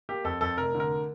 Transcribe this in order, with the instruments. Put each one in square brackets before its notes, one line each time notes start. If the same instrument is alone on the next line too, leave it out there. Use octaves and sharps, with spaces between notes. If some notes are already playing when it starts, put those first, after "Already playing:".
[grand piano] A#3 G4
F2 A4
F2 A4
F1 A#4
D3
A#4